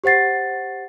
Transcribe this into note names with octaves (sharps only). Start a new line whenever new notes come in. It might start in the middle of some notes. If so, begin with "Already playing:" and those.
G4 C5 F#5 A6 C7